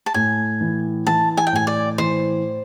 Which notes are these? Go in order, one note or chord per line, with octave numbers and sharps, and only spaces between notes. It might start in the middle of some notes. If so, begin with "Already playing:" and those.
A5
A2 G#5
E3
E3 A5
G#5
G5
A2 G#5
D5
E3 C5